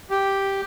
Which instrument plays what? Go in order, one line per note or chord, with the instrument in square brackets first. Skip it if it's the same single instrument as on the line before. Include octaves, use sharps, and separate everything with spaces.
[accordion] G4